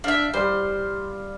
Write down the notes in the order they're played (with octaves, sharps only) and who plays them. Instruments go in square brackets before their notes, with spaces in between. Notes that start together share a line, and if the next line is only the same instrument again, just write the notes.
[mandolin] D4 E5 [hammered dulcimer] F5
[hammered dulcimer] G3 [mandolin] C5